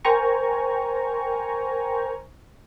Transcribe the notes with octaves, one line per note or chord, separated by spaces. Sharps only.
A#4 C5 G5 G#5 A#5 C#6